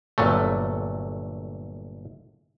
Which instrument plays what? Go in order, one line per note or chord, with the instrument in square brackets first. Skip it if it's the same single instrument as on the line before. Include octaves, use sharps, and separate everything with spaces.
[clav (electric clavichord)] G1 A#2 F#3 A3